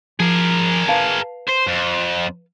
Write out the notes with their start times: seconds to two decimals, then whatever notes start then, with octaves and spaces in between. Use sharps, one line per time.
0.20 F3 G#4 A#4
0.88 B4 F5 A5
1.49 C5
1.68 F2